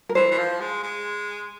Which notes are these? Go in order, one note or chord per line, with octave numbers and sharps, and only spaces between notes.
A#4
E3 C5
E3
F3
G#3
G#3